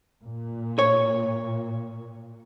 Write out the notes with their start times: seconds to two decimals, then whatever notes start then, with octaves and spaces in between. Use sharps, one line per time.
0.22 A#2
0.79 C#5